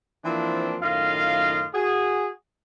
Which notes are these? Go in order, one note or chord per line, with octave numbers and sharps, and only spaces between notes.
E3 F3 A#3 C4 D4
F#2 A2 D#3 F4 D#5 F5
F#4 G#4